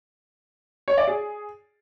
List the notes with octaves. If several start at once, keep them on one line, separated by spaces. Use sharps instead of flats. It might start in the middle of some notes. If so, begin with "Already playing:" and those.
C#5
D5
G#4